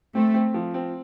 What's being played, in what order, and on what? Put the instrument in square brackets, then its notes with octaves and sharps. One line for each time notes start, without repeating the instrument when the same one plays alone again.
[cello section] A3 [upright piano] C4
[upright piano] C4
F3
C4